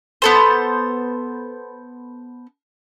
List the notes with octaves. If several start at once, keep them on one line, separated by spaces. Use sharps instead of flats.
B3 A4 C5